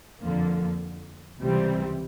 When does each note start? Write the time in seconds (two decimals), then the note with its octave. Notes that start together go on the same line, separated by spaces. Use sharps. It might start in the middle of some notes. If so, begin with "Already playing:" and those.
0.21 F2 D3 F3 A#3
1.40 C#2 C3 E3 G3 C4